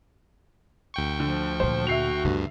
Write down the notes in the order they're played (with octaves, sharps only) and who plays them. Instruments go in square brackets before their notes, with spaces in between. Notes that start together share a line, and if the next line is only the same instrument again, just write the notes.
[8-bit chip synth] D2 G5 C#6
[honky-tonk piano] D3 [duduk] F3
[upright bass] A#2 D#3 [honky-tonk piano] C5
[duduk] F#4 [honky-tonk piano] E5 C7 F7
[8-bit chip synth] D2 G2 [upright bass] D3 D#3